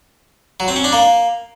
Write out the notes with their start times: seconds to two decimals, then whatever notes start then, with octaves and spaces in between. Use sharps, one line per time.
0.60 F#3
0.68 C4
0.76 C#4
0.84 D4
0.92 A#3